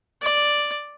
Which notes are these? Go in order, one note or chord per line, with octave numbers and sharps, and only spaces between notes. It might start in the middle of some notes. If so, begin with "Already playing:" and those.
D5